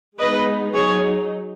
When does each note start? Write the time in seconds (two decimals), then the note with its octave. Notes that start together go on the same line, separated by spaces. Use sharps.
0.18 G#3 B3 D#4 B4 D#5
0.74 F#3 D#4 G#4 C#5